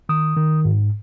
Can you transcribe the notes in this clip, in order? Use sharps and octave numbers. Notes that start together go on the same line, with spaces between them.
D#3 D#6
D#3
G#2